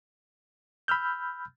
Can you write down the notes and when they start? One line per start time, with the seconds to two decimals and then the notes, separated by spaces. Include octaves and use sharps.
0.88 B5 E6 F6 G6